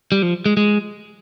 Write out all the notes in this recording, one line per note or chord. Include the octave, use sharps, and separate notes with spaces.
G3
F3
G#3
G#3